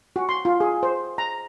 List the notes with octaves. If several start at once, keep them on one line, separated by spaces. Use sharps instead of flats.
F#4
C6
F4
G#4
C5
A#5